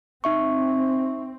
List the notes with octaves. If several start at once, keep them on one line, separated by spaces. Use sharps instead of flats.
C4 D#4 E5 C#6